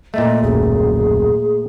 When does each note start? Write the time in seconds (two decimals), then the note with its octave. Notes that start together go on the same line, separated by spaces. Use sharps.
0.14 A#2 A3 D#5
0.43 D#1 B1 F#2 G#4